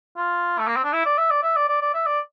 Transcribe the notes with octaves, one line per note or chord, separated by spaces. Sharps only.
F4
A3
A#3
C4
D4
E4
D5
E5
D5
E5
D5
D5
D5
E5
D5